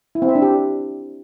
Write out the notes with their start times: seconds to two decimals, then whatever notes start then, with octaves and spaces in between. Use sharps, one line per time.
0.15 E4
0.22 C4
0.29 E5
0.35 D4
0.42 G4